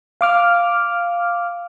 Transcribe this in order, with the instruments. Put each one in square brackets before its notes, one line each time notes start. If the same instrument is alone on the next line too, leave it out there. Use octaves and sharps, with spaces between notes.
[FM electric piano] F5 D6 F6